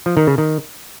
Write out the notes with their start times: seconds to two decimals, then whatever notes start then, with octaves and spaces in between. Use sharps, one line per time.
0.06 F3
0.17 D#3
0.27 C#3
0.38 D#3